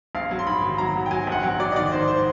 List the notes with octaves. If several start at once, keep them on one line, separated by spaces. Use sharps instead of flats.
A#1 F5
F#3
C6
G#2 B5
D#3
F#3 A#5
F#3
G5
F#3 G#5
A#1 F#5
F#3 G5
F#3 D5
D#5
D#3 D5
G#2 C5
C5